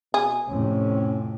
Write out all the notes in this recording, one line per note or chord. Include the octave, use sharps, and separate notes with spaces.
B2 G#4
F2 A2 C3 C#4